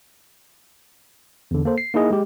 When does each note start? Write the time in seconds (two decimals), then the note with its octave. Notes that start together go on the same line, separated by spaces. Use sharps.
1.51 E2 D3
1.65 A#3 A4 C5
1.78 C7
1.94 A#3 D#4 E4 G#4 D#5
2.10 G#3 G4